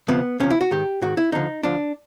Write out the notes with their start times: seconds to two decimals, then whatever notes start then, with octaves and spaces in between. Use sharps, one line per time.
0.08 D2 C3 F3 B3
0.40 D2 C3 F3 C#4
0.50 E4
0.61 F#4
0.71 G#2 D#3 G4
1.02 G#2 D#3 F#4
1.17 E4
1.32 D2 D3 F3 D#4
1.63 D2 D3 F3 D4